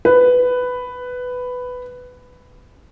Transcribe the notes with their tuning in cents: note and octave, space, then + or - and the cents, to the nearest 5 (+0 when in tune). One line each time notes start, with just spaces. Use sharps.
B4 +10